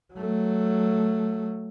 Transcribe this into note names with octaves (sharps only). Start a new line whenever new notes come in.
F#3 A3